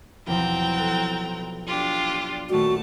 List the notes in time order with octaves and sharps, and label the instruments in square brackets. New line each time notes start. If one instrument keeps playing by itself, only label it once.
[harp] B1 E2 F3 [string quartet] C4 G5 A#5
[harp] A4 F6 F#6
[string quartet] D4 F4 G4
[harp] D#1 D5 [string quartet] A3 A5 [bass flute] F#4